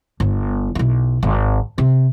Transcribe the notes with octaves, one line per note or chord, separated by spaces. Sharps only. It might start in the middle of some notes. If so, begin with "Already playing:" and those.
G1
B1 E4
G#1
C3